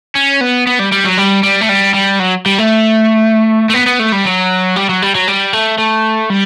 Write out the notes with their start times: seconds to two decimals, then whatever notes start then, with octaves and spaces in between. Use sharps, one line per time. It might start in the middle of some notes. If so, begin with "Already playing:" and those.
0.15 C#4
0.41 B3
0.67 B3
0.79 G3
0.92 G3
1.05 F#3
1.18 G3
1.43 G3
1.61 A3
1.69 G3
1.94 G3
2.20 F#3
2.46 G3
2.58 A3
3.70 A3
3.74 B3
3.86 B3
3.99 A3
4.12 G3
4.25 F#3
4.76 G3
4.89 F#3
5.02 G3
5.15 F#3
5.28 G3
5.53 A3
5.78 A3
6.30 G3